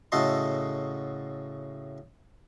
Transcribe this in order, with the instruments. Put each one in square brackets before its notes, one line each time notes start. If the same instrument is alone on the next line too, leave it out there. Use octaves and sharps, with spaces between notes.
[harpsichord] A2 C#3 F#4 A4 D#5 C6